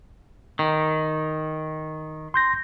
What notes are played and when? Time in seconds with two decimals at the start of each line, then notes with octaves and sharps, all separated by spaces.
0.59 D#3
2.34 C6 G6 A#6